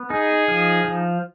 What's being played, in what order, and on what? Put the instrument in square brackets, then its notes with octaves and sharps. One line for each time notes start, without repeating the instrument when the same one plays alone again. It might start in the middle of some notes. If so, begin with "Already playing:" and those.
Already playing: [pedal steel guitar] B3
[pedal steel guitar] D#4 [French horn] G#4
[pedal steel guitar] F3
F3